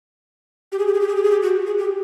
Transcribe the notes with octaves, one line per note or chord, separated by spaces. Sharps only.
G4
G#4
G4
G#4
G4
G#4
G4
G#4
G4
F#4
G#4
G4